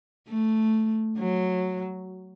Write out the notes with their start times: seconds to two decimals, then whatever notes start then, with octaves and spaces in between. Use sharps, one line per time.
0.28 A3
1.18 F#3